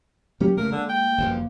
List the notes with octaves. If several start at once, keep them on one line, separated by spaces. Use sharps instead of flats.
F#3 A#3 C#4 G4
G2 C#3 A3 A#3 A#4
D3 G#3
G5
G1 F#2 F3